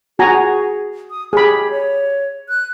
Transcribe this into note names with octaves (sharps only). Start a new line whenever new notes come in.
F#4 G#4 G#5 A#5
D#6
G4 G#4 B5
C#5
F#6